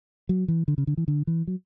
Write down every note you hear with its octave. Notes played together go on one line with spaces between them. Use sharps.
F#3
E3
D3
C#3
D3
E3
D3
E3
F#3